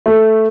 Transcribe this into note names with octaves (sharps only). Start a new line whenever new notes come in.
A3